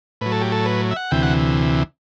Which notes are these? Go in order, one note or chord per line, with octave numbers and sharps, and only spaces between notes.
A2 F#3 B4
A4
G4
A4
B4
E5
F#5
D2 C3 E3 G5
F#5